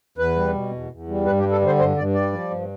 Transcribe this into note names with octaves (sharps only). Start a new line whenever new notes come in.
E2 B4
G3
B2
E2
E2
G3
G2 B4
G4
G3
A4
D3 C5
G2 C5
G2 D5
G3 D5
F3
G2